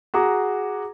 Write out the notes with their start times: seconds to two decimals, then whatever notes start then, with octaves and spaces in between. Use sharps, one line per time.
0.14 F#4 G#4 A#5 D6